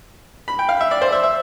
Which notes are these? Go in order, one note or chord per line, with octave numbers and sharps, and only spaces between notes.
B5
G5
F5
E5
D5
C5
E5
E5